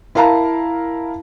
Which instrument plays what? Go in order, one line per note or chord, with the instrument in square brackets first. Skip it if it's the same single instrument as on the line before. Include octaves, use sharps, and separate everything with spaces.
[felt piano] E4 A#4 F5 A5 A#5